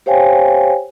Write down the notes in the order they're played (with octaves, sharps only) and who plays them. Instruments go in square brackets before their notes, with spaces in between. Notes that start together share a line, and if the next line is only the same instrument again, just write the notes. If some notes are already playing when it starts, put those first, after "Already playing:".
[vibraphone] G4 C5 C#5 F5 G5 G#5